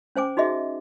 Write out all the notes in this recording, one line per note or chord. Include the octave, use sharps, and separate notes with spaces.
C#4 C5 G#5 D6
D#4 F#4 G#4 D#5 E5